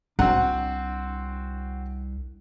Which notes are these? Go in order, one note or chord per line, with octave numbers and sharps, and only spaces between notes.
C2 C4 D4 F#4 F#5